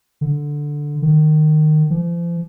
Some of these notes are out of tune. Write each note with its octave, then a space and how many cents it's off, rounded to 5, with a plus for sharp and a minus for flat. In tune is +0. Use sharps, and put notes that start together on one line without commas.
D3 +0
D#3 -20
F3 -40